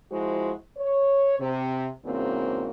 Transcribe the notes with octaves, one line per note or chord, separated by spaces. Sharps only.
F3 G#3 E4 F#4 C5
C#5
C3
E2 G#2 C#3 A#3 C4 F#4